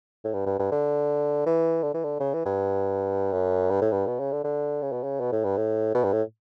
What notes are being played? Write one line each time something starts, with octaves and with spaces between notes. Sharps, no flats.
A2
G2
G2
G2
D3
E3
D3
E3
D3
C#3
E3
G2
F#2
G2
A2
G2
B2
C#3
D3
D3
C#3
B2
C#3
B2
A2
G2
A2
B2
G2
A2